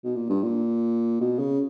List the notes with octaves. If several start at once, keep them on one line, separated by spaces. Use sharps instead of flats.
B2
A#2
G2
A#2
B2
C#3